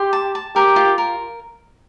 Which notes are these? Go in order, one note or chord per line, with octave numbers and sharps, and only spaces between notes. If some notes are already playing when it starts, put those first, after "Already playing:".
Already playing: G4 C6
A5
A5
G4 A#4
F4
A#4